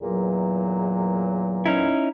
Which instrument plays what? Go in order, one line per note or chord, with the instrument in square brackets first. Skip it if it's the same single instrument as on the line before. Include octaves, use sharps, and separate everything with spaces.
[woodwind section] E2 A#2 F#3
[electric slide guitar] C#4 D#4 E4